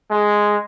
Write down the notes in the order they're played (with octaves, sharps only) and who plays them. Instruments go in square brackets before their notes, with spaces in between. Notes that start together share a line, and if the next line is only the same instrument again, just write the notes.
[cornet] G#3